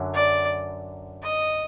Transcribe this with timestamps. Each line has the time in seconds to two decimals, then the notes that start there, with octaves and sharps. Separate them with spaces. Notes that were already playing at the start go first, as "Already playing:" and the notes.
Already playing: F#2 D3 F#3
0.14 D5
1.22 D#5